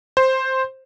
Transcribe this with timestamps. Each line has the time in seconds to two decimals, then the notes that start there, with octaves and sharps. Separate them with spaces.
0.17 C5